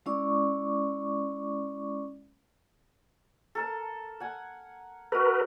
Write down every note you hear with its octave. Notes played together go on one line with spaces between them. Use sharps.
G#3 C#4 E4 D5 C#6 D6
A4 A#4 A5
F#5 G#5
F#4 A#4 B4 D#5